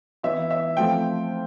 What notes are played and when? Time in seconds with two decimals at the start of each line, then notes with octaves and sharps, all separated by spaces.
0.23 E3 B3 E4 E5
0.51 E5
0.77 F3 A3 C4 G5